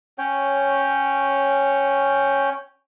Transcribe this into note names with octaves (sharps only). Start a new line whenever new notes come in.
C#4 C#5 G5